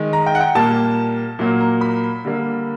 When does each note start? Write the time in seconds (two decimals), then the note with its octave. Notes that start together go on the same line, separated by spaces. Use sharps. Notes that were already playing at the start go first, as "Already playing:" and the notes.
Already playing: D#3 G#3
0.13 A#5
0.26 G5
0.35 F#5
0.40 G5
0.55 A#2 G3 A#3 A5
1.39 A#2 F#3 A#3
1.60 A#5
1.81 B5
2.25 D3 G3 A#3